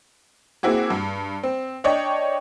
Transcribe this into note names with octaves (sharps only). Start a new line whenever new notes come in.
A#3 C4 E4 F#4 G#4
G2
C4
D4 C#5 D#5 G5